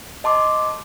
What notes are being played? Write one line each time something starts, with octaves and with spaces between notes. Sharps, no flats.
D#5 A5 C6 D6